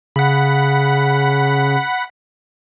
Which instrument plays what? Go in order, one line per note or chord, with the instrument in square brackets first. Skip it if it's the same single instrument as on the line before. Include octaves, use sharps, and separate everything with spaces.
[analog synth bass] C#3 [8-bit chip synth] F#5 B5